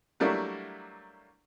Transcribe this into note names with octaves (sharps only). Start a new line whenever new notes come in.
F#3 G3 A3 A#3 D4 E4